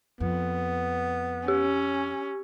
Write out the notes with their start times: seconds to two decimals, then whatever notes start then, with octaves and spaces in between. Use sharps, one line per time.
0.20 F2 B3
1.48 C#4 G4